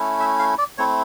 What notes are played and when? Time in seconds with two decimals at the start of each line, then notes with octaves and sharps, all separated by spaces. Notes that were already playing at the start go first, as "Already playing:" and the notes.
Already playing: A3 C#4 E4
0.20 E5
0.39 F5
0.58 D5
0.78 A3 C4 E4 C#5